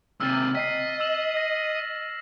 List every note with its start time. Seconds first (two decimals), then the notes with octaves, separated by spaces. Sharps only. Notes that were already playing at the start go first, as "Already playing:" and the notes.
0.20 D#2 C3 E6 F6 A6
0.55 D#5 B6 C7
1.00 E6 E7 F#7
1.37 A#6